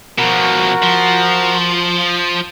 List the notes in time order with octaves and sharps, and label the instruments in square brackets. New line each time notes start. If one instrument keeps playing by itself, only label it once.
[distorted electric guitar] B2 F3 [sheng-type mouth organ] F#4 A#4
[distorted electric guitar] F3